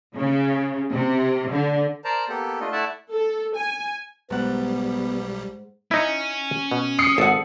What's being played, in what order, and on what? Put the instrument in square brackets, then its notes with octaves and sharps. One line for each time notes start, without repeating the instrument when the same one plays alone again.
[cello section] C#3
C3
D3
[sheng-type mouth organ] A#4 C5 D5 A5 A#5
A#3 B3 G4 A4
A3 D4 F4 D#5
A3 E4 D5 E5 F#5 A5
[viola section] A4
G#5
[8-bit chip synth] B1 G3 [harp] G#2 F#5 [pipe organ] B3
[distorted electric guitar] C#4 [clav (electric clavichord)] D#4 E4
[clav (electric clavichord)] B2
[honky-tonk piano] D#6 C7 C#7
[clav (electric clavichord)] G#1 [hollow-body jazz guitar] A4 F#5